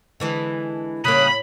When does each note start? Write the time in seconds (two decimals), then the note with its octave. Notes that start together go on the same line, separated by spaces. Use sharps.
0.20 D3 E3 G#3
1.05 A2 C#3 G3 A#3 B5 D#6 F#6